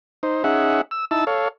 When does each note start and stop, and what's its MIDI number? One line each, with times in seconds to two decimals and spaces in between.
0.23 0.43 63
0.23 0.43 72
0.44 0.81 61
0.44 0.81 63
0.44 0.81 68
0.44 0.81 76
0.44 0.81 78
0.91 1.05 88
1.11 1.25 63
1.11 1.25 64
1.11 1.25 81
1.11 1.25 88
1.27 1.48 69
1.27 1.48 73
1.27 1.48 77